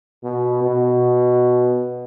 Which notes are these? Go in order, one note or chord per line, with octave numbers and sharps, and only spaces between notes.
B2
B2